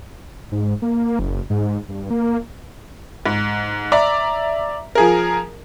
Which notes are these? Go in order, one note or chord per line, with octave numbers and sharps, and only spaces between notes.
G#2
A#3
F#1
G#2
G2
A#3
G#2
D5 E5 A#5 D6
F3 G#4 A#4